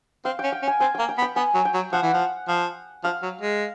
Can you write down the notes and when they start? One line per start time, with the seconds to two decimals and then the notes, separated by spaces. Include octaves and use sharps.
0.25 C4 F5
0.39 C#4 G5
0.52 G5
0.62 C#4
0.68 G#5
0.80 C4 G#5
0.95 A#3 G5
1.09 G5
1.18 B3
1.22 G5
1.36 B3 G#5
1.55 F#3
1.65 G5
1.74 F#3
1.92 F3 F#5
2.03 E3
2.13 F3
2.49 F3
3.04 F3 F5
3.23 F#3
3.41 G#3